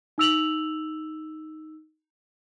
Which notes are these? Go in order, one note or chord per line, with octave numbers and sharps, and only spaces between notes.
D#4 E6 F7 F#7